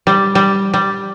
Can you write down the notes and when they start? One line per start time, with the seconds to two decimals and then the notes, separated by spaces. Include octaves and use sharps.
0.07 G3
0.35 G3
0.74 G3